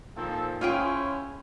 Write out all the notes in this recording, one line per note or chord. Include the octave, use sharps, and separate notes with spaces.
A#2 D#3 F3 C4 A4
C#4 E4 F4 G#4 C5 C#5 G5